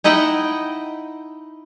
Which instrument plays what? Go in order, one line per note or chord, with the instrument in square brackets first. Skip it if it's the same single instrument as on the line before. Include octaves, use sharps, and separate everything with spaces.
[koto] D#4 E4 D#5 F#5 G5